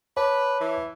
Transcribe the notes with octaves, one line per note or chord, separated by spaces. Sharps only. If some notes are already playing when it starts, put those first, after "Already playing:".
B4 C#5 A5 D6
E3